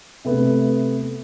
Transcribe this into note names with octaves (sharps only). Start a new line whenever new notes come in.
C3 A3 B3